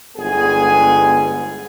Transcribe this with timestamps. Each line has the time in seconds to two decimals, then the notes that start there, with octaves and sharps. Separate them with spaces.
0.17 G1 G#2 B3 G#4 G#5